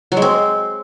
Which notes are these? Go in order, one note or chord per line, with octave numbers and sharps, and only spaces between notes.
F#3
G#3
C4